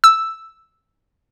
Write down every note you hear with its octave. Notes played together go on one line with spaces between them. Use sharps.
E6